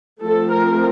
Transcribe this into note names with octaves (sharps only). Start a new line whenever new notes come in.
F3 A3 C4 A4
A#4